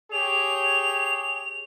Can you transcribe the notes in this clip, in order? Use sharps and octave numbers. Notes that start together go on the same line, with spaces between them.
G4 G#4 C#5 F7